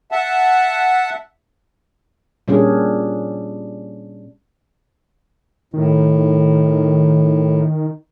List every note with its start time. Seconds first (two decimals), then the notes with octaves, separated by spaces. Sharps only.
0.12 E5 F#5 A5
2.48 A#2 G3 C#4 D4 G#4
5.74 A2 D#3